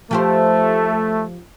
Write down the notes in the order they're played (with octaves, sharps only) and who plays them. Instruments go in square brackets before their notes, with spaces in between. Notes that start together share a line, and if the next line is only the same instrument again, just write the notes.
[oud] F3 G4 C5 [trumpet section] A3